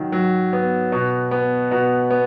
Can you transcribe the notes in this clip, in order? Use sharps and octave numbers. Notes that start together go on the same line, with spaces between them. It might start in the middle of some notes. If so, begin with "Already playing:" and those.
Already playing: D#3 F#3
F#3
B3
B2
B3
B2
B3